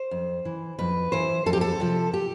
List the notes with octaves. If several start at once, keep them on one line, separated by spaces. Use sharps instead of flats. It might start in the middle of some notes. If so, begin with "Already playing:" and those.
Already playing: C5
F2
E3
F2 B4
E3 C5
F2 A4
G4
A4
C3 F3
G4